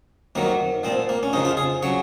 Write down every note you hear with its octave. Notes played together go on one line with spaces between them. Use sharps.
F2 D#3 F#3 A#3
A#2 F3 C4
A#3
C#4
F2 C#3 F3 D#4
F4
G#4
C#3 F#3 C#5